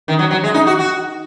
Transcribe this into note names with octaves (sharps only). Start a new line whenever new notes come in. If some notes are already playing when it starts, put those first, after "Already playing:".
D#3
F#3
F#3
G#3
D#4
F#4
F#4